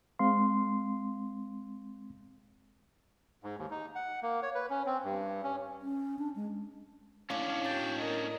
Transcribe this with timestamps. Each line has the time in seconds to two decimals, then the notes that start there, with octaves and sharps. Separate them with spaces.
0.19 G#3 C4 F5 C6
3.43 G#2
3.58 D#2
3.71 D#4
3.95 F#5
4.22 A#3
4.43 C#5
4.55 B4
4.70 C#4
4.86 C4
5.04 G2
5.43 C#4
5.82 C#4
6.19 D4
6.36 G#3
7.30 A2 C#4 D4 F5 D6 G#6
7.65 F#4 G5 A5 A6
7.98 A#4 D#5